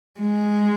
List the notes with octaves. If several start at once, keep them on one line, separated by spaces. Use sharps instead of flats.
G#3